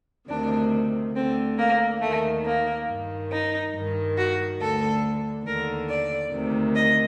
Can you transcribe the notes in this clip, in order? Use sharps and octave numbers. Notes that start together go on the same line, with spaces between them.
D2 C3 D#3 D4
D2 D3 C4
A#3
D#2 D#3 A3
A#3
G2 D#3
D#4
G2
D#3
F#4
D2 D3 A4
D#2 D3 A#4
D5
D2 C3 D#3
D#5